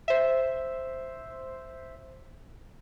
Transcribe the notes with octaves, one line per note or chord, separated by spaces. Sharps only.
C5 E5